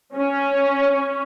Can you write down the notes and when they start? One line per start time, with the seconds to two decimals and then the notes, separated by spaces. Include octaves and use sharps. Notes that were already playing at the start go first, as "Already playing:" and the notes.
0.16 C#4